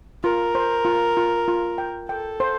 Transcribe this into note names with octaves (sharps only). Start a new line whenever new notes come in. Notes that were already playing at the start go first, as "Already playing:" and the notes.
F4 A#4
C5
F4
F4
F4
G5
A4 G5
C5